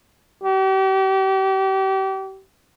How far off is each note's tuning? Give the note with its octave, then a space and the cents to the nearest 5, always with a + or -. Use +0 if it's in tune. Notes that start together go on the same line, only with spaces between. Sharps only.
G4 -35